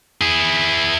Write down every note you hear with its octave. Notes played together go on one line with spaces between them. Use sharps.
E4 G#4